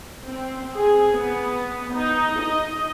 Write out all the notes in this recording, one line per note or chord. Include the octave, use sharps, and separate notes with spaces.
C4
G#4
B3
D#4
D#5